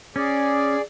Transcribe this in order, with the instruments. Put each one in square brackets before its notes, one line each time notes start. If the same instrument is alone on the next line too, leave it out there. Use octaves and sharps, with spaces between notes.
[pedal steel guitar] C#4 [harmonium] G#4 D5